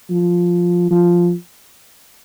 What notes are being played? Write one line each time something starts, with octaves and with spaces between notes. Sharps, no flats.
F3
F3